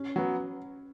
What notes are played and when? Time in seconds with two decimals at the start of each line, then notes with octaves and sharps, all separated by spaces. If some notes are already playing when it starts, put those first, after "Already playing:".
Already playing: C#4
0.16 F#3 B3